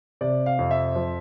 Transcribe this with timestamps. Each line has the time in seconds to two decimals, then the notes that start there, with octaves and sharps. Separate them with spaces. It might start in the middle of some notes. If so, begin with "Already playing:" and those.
0.21 C3 D5
0.46 F5
0.59 F2
0.71 E5
0.96 F3